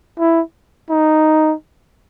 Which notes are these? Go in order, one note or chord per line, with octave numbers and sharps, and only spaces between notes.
E4
D#4